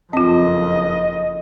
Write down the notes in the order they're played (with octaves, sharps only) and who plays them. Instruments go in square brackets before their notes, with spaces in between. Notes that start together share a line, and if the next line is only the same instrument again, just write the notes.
[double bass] F#1 F2 [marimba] C4 F4 [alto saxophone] D#5